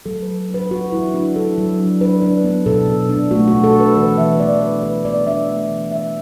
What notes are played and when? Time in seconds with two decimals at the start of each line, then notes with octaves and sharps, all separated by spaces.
0.06 F#3 A4
0.22 F#3 B4
0.49 D4
0.54 B4
0.71 D4 F#4
0.92 F#3 E4
1.14 D4 F#4
1.36 D4 A4
1.58 F#3
1.79 D4
2.01 D4 B4
2.23 D4
2.44 B3
2.66 B2 A4
2.88 B2
3.10 D4
3.31 A3 F#4
3.48 F#4
3.53 B2
3.64 A4
3.75 D4
3.80 B4
3.97 E3 B4
4.18 E3 E5
4.40 B3 D5
4.61 D4 B4
4.83 E3 B4
5.05 B3 D5
5.27 D4 E5
5.49 A3
5.70 E3
5.91 E3 E5